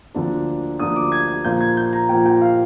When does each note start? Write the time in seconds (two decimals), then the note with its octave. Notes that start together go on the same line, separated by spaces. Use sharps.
0.15 D2 D3 F3 A#3 D4
0.80 D2 D3 F3 A#3 D4 D#6
0.96 D6
1.12 G#6
1.28 G#6
1.44 A#2 F3 A#3 F4 G6
1.60 G#6
1.77 G6
1.93 A#5
2.09 A#2 F3 A#3 F4 G5
2.26 G5
2.42 F5